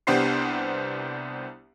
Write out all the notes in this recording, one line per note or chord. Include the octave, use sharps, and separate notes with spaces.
C2 B3 D4 G4 C5 C7